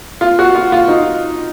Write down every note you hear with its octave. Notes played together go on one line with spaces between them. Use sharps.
F4
F#4
F4
F4
D#4